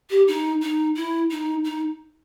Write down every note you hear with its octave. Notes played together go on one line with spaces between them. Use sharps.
G4
D#4
D#4
E4
D#4
D#4